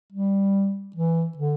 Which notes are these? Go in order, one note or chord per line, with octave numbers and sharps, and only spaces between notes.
G3
E3
D3